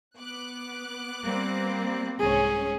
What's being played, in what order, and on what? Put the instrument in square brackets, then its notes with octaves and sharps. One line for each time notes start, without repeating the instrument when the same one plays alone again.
[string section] B3 D6 F#6
[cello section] G3 A#3 C4
[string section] C2 G#2 C#4 [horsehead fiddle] G#4